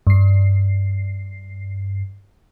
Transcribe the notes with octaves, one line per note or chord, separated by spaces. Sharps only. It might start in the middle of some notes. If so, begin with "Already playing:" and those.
G2 C7